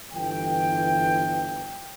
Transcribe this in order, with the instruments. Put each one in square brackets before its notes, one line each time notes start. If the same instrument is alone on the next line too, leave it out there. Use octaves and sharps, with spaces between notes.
[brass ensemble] G1 E3 G5